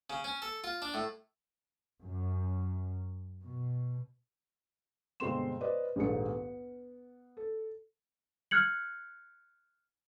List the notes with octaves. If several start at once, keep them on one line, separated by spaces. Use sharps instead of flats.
C#3
C#4
A4
F4
D4
A2
F#2
B2
G1 B2 G#3 C4 C6 E7
B4 C5 D5 D#5
A#1 D#2 G#2 A4 B4 C#7
B3
A4
F6 F#6 G#6 C#7 F#7